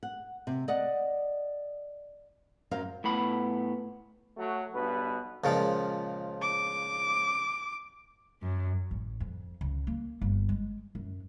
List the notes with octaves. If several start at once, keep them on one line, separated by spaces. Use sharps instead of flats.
F#5
C3
D5 D#5 F#5
F#2 A#4 C5 F5
A2 B3 B5
F#3 A3 F#4
B1 G2 B2 B4
C#2 A#2 F3
D6
F#2
A1
F2
C#2
A#3
G1
G#3
F#2